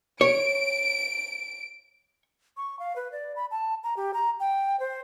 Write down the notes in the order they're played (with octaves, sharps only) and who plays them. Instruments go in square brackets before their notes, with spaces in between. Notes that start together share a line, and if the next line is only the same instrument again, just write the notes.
[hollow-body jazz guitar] C#5 [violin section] D7
[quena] C#6
F5
B4
D5
B5
A5
A#5
G4
A#5
G5
C5